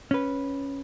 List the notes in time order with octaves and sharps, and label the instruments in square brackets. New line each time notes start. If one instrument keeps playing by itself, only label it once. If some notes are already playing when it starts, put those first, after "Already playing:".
[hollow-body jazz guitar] C#4 B4